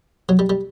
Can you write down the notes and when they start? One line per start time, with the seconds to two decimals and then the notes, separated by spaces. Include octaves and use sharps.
0.29 F#3
0.39 G3
0.50 G3